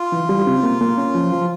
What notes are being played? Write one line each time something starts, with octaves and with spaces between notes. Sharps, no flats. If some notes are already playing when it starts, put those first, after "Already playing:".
Already playing: F4
E3
G3
C3
A#3
A#3
C#4
F3
F3